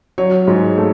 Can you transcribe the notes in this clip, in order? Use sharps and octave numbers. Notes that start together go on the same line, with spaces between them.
F#3 C#5
G#2
A3